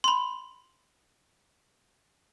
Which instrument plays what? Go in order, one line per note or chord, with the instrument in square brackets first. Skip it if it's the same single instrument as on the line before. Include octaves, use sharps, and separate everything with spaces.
[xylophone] B5 C6